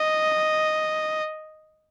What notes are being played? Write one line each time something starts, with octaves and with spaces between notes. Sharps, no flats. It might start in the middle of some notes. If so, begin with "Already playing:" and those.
Already playing: D#5